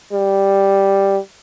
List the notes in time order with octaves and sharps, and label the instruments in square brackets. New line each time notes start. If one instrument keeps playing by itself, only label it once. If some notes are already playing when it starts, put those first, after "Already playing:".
[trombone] G3